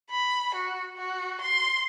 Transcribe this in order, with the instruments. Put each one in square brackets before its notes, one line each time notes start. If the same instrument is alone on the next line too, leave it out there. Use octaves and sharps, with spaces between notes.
[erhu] B5
F#4
F#4
C6